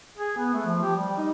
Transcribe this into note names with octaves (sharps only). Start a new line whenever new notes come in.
G#4
B3
A3
F3
G4
G3
D#4